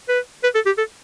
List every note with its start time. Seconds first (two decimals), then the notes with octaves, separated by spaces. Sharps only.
0.09 B4
0.43 B4
0.55 A4
0.66 G4
0.78 A4